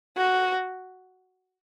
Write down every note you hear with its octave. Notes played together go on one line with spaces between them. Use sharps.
F#4